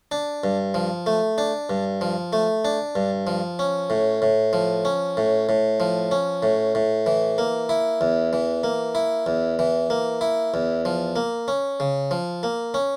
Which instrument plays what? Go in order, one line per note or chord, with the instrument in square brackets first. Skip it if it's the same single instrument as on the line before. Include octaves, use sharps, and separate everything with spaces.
[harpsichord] D4
G2
F3
A3
D4
G2
F3
A3
D4
G2
F3
C#4
A2
A2
F3
C#4
A2
A2
F3
C#4
A2
A2
E3
A#3
E4
E2
E3
A#3
E4
E2
E3
A#3
E4
E2
F3
A#3
C#4
C#3
F3
A#3
C#4